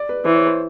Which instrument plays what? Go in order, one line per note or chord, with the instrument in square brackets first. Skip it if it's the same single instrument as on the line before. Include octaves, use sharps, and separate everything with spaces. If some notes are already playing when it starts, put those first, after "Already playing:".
Already playing: [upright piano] D5
B4
[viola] E3 [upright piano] C5
[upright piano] C#5
C5